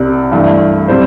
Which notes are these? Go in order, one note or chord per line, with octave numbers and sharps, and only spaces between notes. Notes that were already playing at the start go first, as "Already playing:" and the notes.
Already playing: C2 C3 G3 D5
G2 E3 A3
C3 G3 C5